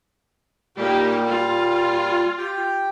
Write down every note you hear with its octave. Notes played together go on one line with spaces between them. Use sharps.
A#2 G3 A#3 D#4 G4
F4
G4 G5